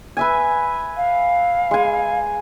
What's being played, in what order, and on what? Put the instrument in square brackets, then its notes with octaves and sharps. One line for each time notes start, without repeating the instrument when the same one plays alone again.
[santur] B4 E5 G#5
[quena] F5
[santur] G#3 G#5